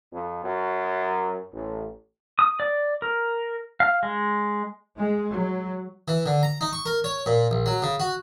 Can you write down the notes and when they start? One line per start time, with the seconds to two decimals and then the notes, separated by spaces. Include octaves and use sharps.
0.13 F2
0.44 F#2
1.53 A1
2.39 D#6
2.60 D5
3.02 A#4
3.80 F5
4.03 G#3
4.96 G#3
5.31 F#3
6.08 E3
6.26 D3
6.43 A#5
6.61 D#4
6.73 C#6
6.86 A#4
7.04 C#5
7.26 A#2
7.51 A#1
7.66 F#3
7.82 C#3
8.00 F#4